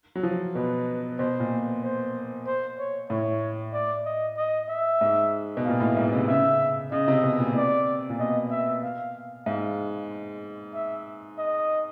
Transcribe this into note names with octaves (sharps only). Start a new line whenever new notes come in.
F#3
F3
B2 B4
B2 C5
A#2
C5
C5
C#5
A2 C#5
D5
D#5
D#5
E5
G#2
B2
A#2 F5
A2
G#2
C3
C#3 E5
C#3 D#5
C3
B2
A#2
C3 D5
A#2
B2 D#5
E5
F5
G#2 F5
E5
D#5